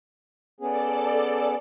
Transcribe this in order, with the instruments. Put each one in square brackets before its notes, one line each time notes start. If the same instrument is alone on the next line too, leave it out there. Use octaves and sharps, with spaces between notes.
[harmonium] B3 C#4 G#4 [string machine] A4 D5